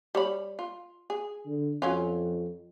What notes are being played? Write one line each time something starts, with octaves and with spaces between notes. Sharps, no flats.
G3 C#5 B5
F4
G#4
D3
F2 F#3 C#4 F4